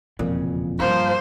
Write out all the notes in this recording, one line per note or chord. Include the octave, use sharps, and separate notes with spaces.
E1 F2 A#2 C#3
G2 F3 A#3 F4 C5